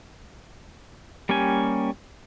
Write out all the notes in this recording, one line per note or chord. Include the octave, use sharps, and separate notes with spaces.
G3 A#3 C#4 G4 G#5